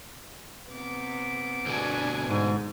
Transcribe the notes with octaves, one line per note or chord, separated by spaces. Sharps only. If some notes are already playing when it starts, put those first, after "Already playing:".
C3 B3 D6
D2 B2 D4 G#5
G#2